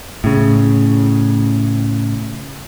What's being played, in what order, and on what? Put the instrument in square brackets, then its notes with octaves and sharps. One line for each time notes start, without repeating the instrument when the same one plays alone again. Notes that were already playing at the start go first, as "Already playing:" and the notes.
[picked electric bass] A2 C#3